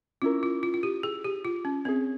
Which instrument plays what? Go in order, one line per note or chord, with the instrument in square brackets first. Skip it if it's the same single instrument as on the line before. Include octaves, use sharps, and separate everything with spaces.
[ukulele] C#4 E4 A#4 [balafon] F4
[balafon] F4
F4
F4
G4
G#4
G4
F4
C#4
[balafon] C4 [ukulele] G#4 C#5 E5